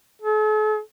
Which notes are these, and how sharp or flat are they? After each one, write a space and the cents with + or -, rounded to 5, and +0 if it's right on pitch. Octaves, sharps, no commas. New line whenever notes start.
A4 -45